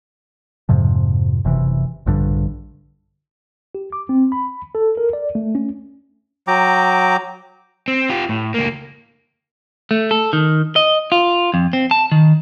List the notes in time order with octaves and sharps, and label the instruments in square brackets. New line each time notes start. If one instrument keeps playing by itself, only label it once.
[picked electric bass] F2 G#2 C3 F3
F#1 C3 E3
A#1 G2 D3
[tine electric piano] G4
D6
C4
B5
A4
A#4
D5
A3
C#4
[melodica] F#3 G5 A#5 D6
[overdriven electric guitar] C4
F4 G4
A2
C#2 A#3
[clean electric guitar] A3
A4
D#3
D#5
F4
F2
C4
A5
D#3